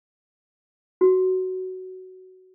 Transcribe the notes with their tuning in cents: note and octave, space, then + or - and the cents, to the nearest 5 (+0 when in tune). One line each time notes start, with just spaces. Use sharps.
F#4 +10